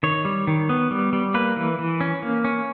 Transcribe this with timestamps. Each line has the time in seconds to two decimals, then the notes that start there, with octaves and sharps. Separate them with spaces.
0.03 D#3 C#5
0.25 G3
0.47 D#3
0.69 B3
0.91 G3
1.13 G3
1.34 A#3 B4
1.56 E3
1.79 E3
2.01 C#4
2.22 A#3
2.45 C#4